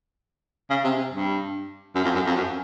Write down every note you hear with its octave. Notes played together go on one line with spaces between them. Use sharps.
C#3
C3
C3
G2
F#2
F2
F#2
F2
F#2